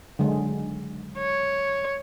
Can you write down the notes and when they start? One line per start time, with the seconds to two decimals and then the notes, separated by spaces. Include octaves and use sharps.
0.19 D3 F#3 G#3
1.18 C#5